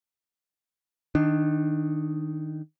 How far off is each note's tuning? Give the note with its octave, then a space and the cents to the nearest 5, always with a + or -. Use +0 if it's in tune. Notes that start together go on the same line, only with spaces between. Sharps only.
D#3 +0 D4 +10